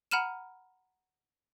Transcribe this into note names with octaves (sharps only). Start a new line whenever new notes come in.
F#5 A#5 B5 F6 D#7 E7